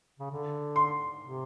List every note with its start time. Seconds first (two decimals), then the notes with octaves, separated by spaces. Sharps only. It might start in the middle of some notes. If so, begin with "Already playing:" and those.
0.19 C#3
0.31 D3
0.76 C6
1.21 C3